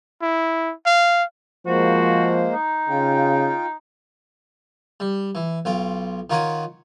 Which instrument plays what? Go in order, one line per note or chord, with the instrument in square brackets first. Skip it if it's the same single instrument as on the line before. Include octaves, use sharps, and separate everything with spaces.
[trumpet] E4
F5
[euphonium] F3 [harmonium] G#3 A#3 C5 [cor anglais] F#4
[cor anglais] D#4
[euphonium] C#3 [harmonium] F4 G5
[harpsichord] G3
E3
B1 F4 G5
D#3 F4 A#4 C#5 F#5 G#5